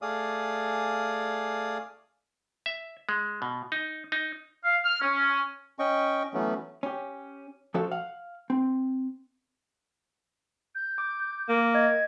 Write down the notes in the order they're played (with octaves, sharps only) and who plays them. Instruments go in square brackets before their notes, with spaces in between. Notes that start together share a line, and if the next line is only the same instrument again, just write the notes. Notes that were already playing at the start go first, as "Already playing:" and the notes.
[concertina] A3 G#4 D5 F5 D#6
[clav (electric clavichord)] E5
G#3
B2
D#4
D#4
[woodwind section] F5
F6
C#4
[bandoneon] C#4 D#5 G5 C#6
E3 F#3 A3 B3 C#4
[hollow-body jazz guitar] C#4 G4
F3 C#4 F#4 A4 C5 F5
F5 F#5
C4
[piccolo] G6
[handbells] D6
[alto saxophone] A#3
[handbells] D#5 [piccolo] G#6